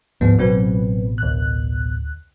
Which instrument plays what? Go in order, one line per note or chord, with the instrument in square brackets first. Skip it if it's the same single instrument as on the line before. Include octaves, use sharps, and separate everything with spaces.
[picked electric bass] D2 G#2 F3 [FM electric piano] B3
[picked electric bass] A1 B2 [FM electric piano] F#3 C4 B4
[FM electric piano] D2 F#6